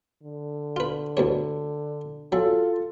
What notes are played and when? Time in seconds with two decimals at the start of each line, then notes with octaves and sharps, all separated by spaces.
0.23 D3
0.76 F4 B4
1.17 D2 G2 C#5
2.32 F#3 F4 A4